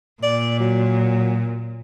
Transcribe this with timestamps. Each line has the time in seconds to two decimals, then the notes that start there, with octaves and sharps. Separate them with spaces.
0.23 A#2 D5
0.60 F#3